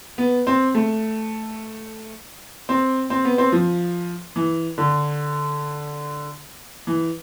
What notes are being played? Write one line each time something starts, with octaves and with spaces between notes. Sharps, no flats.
B3
C4
A3
C4
C4
B3
C4
F3
E3
D3
E3